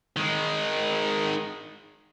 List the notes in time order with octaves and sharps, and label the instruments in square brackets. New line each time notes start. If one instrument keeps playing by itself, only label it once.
[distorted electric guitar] D#3 G#3